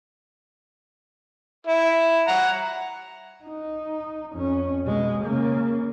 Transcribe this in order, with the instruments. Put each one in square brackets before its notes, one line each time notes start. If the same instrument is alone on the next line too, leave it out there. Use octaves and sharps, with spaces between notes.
[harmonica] E4
F#5 A#5
[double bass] D#4
F2 C#4
B2 G#3
C#3 A#3